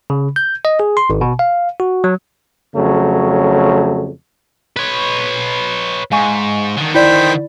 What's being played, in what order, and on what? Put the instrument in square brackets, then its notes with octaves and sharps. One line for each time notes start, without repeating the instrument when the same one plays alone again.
[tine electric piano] C#3
G6
D#5
G#4
C6
G#1
B2
F5
F#4
F#3
[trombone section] F2 C#3 F#3 A3
[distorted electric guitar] B4 C#5
[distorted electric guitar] G#2 [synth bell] F5 G#5 C#6
[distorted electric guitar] D3 D#3
[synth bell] E4 D5 [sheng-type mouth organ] C5 G5 B5